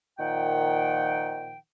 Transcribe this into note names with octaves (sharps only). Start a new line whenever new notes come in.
A#2 D#3 F3 F#5 G5